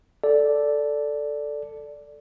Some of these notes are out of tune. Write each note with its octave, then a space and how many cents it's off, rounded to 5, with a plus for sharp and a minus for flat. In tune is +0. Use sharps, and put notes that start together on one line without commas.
A4 +0 D5 -5